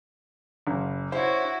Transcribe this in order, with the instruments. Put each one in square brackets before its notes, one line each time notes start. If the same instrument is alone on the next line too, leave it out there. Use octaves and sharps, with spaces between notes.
[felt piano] F#1
[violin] E4 F#4 [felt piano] C5 C#5